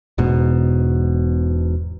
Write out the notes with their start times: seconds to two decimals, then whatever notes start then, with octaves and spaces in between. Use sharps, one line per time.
0.18 E1 G#2 B2